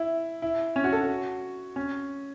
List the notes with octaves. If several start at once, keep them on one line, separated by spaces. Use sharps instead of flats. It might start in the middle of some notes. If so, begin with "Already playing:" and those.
Already playing: E4
E4
C#4
F#4
A4
F#4
C#4